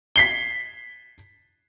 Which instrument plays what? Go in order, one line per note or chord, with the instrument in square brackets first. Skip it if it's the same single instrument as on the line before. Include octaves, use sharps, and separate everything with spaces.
[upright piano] B6 C7 G7